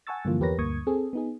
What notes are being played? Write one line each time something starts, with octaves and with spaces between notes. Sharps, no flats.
F#5 G#5 A5 C#6 E6 A6
G2 D3 E3 F3 A#3 F4
E2 G4 A#4 B4 C#5 A#6
D2 G2 A#3 C#6 D#6 G#6
C4 G#4 A4
B3 D#4 G#4